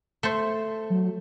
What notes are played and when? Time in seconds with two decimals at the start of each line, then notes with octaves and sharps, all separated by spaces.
0.23 A3 C5
0.90 F#3